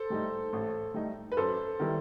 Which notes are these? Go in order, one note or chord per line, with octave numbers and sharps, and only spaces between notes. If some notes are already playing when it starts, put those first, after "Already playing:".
Already playing: A4 C5
A2 G3 D#4
A1
A2 G3 D#4
B4
F#2 A4 C5
D#3 G3 B3 E4